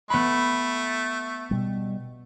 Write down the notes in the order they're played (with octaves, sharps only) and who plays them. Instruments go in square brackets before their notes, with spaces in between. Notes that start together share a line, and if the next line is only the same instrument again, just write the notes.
[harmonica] A3 [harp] B3 B5
[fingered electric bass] B2 G3